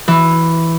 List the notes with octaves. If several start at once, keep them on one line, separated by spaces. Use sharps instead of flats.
E3